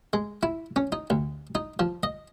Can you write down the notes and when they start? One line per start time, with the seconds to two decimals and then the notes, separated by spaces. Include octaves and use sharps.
0.13 G#3
0.43 E4
0.76 C#4
0.92 D#4
1.10 D2
1.55 D#4
1.79 F3
2.03 D#5